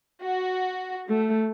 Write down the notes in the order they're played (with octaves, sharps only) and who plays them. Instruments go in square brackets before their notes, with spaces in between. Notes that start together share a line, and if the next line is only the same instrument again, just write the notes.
[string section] F#4
A3